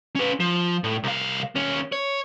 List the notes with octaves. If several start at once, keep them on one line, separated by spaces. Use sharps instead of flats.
C#4 B4
F3
A2
C2 F5
D#2 C#4
C#5